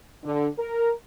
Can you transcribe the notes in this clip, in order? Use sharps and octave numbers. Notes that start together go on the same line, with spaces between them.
D3
A#4